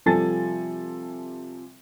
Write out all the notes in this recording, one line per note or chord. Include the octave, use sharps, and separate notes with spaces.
C3 F3 G3 A4 G#5 A6